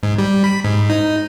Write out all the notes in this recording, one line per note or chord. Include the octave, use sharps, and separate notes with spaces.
G#2
G3
B5
G#2
D#4